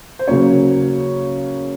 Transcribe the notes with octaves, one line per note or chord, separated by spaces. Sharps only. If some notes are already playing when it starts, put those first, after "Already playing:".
C5
C#3 F#3 A#3 C#4 C#5